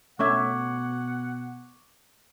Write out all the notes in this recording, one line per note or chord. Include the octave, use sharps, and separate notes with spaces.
B2 A3 C#4 E5 F#5 C#6 D6 G#6